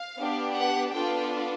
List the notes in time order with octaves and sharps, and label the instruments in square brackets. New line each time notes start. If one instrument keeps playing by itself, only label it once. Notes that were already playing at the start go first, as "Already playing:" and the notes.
Already playing: [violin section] F5
B3 D4 G4
F#5
B3 D4 F4 A4 G5